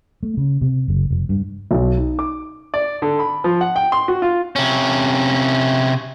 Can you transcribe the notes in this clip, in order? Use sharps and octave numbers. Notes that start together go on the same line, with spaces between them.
A3
C#3
C3
F#1
F1
G2
B1
D#4
D6
D5
D3
B5
F3
F#5
G5
C6
F#4
F4
C3 C#4